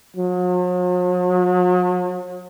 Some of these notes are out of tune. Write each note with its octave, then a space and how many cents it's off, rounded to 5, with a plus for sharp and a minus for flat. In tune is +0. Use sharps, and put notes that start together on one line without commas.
F#3 -45